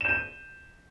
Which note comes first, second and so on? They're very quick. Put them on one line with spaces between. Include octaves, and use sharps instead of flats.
E7 G6 D#7